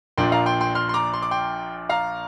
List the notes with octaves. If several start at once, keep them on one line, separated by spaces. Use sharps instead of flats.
A#1 A#2 F3 D4 G5 C6
F5 A#5
G5 C6
G5 C6
C6 F6
C6
A#5 D6
C6
D6
G5 C6
F5 A#5